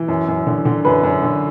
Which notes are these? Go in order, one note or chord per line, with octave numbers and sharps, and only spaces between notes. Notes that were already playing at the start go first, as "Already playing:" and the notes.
Already playing: E3
F#2
F#2
D3
D3
F#2 B4
F#2
D3